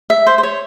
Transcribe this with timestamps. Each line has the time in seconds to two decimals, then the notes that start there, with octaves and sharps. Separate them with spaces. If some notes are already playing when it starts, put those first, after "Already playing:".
0.10 E5
0.27 C5
0.38 C5
0.43 C#5